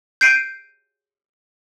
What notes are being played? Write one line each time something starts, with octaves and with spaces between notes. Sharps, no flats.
G6 C7 D7 D#7